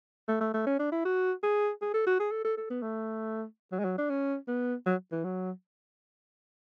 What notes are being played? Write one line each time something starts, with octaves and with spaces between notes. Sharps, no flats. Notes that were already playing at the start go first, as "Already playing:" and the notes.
A3
A3
A3
C#4
D4
E4
F#4
G#4
G#4
A4
F#4
G#4
A4
A4
A4
B3
A3
F#3
G#3
F#3
D4
C#4
B3
F#3
E3
F#3